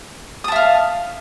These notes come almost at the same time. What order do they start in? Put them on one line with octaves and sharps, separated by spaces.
D#6 A5 E5 F5